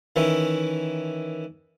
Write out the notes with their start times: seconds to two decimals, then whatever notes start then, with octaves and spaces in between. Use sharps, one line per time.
0.16 D#3 E3 C#4 E4